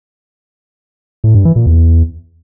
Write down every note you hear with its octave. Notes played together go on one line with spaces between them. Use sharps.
A2
G2
E3
A#2
E2